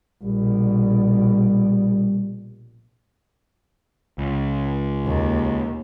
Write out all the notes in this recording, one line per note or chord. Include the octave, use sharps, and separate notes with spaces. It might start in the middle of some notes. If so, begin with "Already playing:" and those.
A#1 B2 G3
C#2
D#2